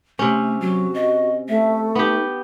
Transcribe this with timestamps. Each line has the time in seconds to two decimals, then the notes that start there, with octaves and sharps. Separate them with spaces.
0.19 C3 A3 C#4
0.61 F#3 F#4
0.94 D#5
1.49 A3 E5
1.95 B3 D#4 G4